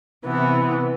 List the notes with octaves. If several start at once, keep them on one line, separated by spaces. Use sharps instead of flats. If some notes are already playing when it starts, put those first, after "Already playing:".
C3 E3 B3